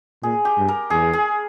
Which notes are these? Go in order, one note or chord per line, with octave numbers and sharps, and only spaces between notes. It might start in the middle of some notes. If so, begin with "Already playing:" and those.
A#2 G#4
G4
G2
A#4
E2 G#4
G#4